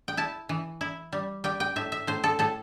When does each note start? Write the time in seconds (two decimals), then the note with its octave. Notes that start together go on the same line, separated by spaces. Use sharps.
0.08 G5
0.17 E4 A5
0.49 E3
0.81 E4
1.13 G3
1.44 G3 G5
1.60 G5
1.76 A2 E5
1.92 E5
2.07 A2 C5
2.24 A4
2.39 A2 A4